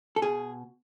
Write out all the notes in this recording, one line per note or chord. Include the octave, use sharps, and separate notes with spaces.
A4
B2 G#4